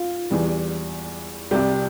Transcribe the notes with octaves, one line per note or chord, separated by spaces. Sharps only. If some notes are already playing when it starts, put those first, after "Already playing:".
Already playing: F4
E2 E3 G3
C2 C3 G3 G4